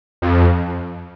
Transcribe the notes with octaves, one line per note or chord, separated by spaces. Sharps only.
F2